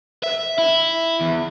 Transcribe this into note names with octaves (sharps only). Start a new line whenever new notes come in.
E5
E4
E2